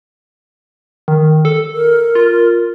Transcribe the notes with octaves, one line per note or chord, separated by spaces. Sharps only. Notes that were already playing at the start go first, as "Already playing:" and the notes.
D#3
A4
A#4
F4